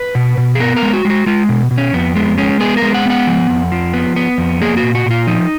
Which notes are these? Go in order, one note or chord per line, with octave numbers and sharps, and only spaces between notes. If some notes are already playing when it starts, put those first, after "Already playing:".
Already playing: B4
B2
B2
G#4
B3 A#4
A#4
G#3
F#4
G#3
F#4
G#3 F4
B2
B2
C#4
F2 B3
G#3 B3
G#3 C#4
B3 G#4
A#4
G#3
F#5
B3 F#5
F3
F2
F3
B3
B3
F2
A#3 G#4
F#4
A#2
F#4
A#2 F4
F3 D#4